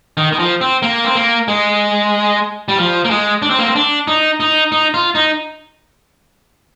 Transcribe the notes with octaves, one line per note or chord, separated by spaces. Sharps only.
D#3
D#3
F3
C4
A#3
C4
A#3
G#3
G3
F3
A#3
G#3
D4
C4
A#3
C4
D4
D#4
D#4
D#4
F4
D#4